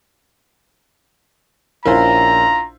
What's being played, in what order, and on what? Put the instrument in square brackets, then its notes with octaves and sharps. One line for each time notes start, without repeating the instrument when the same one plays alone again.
[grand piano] A#1 C#4 A#4 [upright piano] E4 F4 C5 [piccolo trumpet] A#5